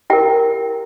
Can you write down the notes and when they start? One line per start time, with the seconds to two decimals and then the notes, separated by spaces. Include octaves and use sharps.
0.10 E4 G4 A#4 G5